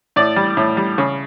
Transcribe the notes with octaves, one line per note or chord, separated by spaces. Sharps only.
A2 D5
G3
A2
G3
C#3